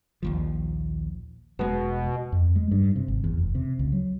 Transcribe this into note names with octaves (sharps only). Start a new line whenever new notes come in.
A#1 D#2 F3
E1 B2 G#3
F2
G#3
G2
C3
G#1
E2
F1
C3
C#2
F#3